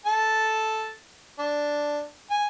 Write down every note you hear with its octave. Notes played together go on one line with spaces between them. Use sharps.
A4 A5
D4
G#5